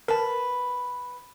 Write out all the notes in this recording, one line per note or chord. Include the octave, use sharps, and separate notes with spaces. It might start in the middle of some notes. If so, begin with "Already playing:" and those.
A#4 B4 A5